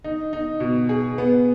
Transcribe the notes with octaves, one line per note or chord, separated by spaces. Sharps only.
D#4
D#4
B2
G#4
B3